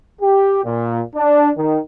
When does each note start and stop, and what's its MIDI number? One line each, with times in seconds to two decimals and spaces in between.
0.21 0.62 67
0.64 1.00 46
1.15 1.50 62
1.56 1.78 51